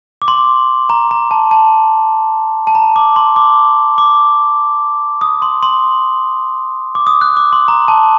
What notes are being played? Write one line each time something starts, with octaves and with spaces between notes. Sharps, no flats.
D6
C6
A#5
A#5
A5
A5
A5
A#5
D6
C6
D6
D6
D#6
C6
C6
D6
D#6
F#6
D6
C6
A#5
A5